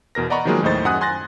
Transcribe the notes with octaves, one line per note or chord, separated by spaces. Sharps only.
E2 B2 A#4 A#6
D5 D#5 F#5 A#5 B5 C#6
D#3 F3 F#3 G#3 A#3 G#4
D#2 A2 D#4 C5 A6
F#2 F#5 G#5 D#6 F#6
G#5 C6 F#6 A6 A#6